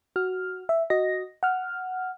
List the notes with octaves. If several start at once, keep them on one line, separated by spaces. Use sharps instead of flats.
F#4 F6
E5
F#4 D#5 A#6
F#5 F6